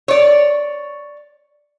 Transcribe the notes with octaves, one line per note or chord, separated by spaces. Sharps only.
C#5 D5